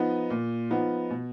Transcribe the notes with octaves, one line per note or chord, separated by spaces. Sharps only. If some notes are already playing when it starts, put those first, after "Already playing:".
Already playing: F3 B3 D#4
A#2
F3 B3 D#4
B2